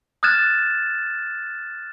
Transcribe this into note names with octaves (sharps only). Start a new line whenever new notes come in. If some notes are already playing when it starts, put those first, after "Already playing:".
D#6 F6 F#6 G#6 A6 E7